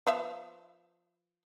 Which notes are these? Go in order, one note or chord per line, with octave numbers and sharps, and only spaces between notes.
F3 B3 E5